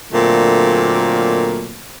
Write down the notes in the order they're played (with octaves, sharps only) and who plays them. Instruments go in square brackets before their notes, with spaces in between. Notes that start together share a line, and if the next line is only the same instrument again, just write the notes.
[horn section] A#2 D3 F#3 A3 A#3 C4